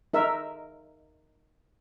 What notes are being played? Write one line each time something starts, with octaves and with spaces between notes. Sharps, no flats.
D#4 A#4 E5